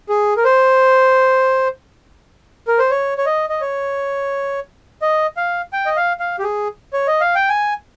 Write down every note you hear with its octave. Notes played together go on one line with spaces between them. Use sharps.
G#4
A#4
C5
A#4
C5
C#5
C#5
D#5
D#5
C#5
D#5
F5
G5
D#5
F5
F5
G4
G#4
C#5
D#5
F5
G5
G#5